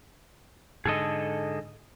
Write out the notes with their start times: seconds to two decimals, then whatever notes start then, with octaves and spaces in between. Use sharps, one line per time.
0.86 G#2 D3 G#4 A4 D#5